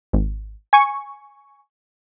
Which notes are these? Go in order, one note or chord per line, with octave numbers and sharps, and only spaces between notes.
G#1
G#5 C#6